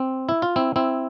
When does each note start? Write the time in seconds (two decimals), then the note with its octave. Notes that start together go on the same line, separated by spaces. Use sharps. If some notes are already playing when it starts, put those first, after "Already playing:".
Already playing: C4
0.29 E4
0.42 F4
0.56 C4 E4
0.76 C4 E4